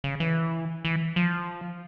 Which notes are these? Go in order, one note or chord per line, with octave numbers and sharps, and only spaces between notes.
C#3
E3
E3
F3